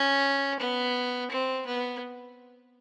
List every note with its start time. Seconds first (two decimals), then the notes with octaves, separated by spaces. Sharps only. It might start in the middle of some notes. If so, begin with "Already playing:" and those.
Already playing: C#4
0.60 B3
1.31 C4
1.67 B3